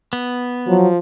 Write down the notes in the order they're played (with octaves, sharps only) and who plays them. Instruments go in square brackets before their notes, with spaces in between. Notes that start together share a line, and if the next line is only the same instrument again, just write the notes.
[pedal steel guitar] B3
[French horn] F3 [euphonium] F#3